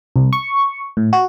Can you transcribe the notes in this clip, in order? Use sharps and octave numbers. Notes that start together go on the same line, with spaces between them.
C2
C#6
A2
F#4